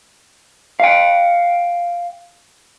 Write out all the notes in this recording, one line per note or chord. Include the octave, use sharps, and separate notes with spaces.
F5 G5